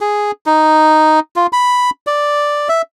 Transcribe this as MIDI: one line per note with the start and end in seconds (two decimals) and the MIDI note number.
0.01 0.31 68
0.46 1.20 63
1.36 1.47 65
1.53 1.90 83
2.07 2.68 74
2.69 2.82 76